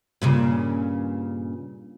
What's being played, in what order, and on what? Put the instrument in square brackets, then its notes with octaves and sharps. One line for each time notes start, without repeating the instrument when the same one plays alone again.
[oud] G2 A#2 C#3